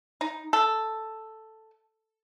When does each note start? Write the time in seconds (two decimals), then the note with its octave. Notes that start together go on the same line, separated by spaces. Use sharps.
0.21 D#4
0.53 A4